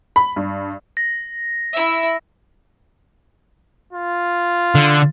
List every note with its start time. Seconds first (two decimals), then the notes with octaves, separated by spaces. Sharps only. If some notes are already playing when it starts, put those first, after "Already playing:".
0.16 B5
0.36 G2
0.97 A#6
1.73 E4 E5
3.93 F4
4.75 D3